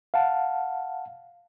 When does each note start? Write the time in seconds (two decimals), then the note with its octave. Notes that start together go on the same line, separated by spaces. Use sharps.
0.14 F5 F#5 A5